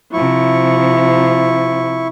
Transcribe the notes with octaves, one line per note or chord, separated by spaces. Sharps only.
C3 F3 E4 C#6